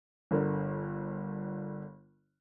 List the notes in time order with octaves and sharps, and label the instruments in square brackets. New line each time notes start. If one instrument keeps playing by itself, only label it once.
[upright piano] G1 D3 A#4